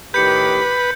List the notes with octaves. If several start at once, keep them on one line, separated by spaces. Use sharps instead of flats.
A2 D#3 G4 B4 G6 C#7